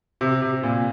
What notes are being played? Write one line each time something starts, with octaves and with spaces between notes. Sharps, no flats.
C3
C3
A#2